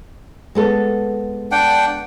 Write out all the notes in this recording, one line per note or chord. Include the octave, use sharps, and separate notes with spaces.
G#3 B3 A4
D4 F#5 G5